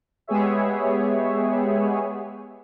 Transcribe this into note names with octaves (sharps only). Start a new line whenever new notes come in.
G#3 B3 G4 G#4 C#5 E5